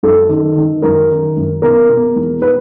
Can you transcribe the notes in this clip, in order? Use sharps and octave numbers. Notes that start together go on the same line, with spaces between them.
F#2 A4
D#3
D#3
F#2 A#4
D#3
F#2
B2 A#4
B2
E2
B4